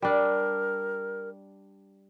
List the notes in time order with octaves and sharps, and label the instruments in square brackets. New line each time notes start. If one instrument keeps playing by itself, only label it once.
[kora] G3 D4 [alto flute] A#4